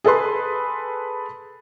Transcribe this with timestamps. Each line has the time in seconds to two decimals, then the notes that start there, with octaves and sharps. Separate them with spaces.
0.04 G#4 A4 B4 C6